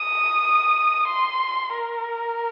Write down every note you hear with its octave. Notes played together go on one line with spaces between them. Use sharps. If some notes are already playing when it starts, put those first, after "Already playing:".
Already playing: D#6
C6
A#4